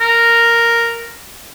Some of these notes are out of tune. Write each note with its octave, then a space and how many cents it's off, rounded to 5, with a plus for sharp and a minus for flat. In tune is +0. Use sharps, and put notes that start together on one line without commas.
A#4 -5